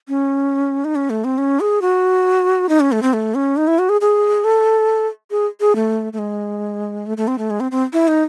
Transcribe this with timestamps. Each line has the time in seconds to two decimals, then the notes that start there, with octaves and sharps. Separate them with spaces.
0.08 C#4
0.85 D#4
0.95 C#4
1.10 A3
1.24 C4
1.38 C#4
1.60 G#4
1.82 F#4
2.69 D#4
2.80 C#4
2.92 A3
3.02 C4
3.13 A3
3.35 C#4
3.57 D#4
3.67 E4
3.79 F#4
3.89 G#4
4.01 G#4
4.44 A4
5.31 G#4
5.60 G#4
5.75 A3
6.13 A3
6.19 G#3
7.06 A3
7.17 A3
7.28 C4
7.38 A3
7.50 G#3
7.60 C4
7.71 C4
7.93 E4
8.08 D#4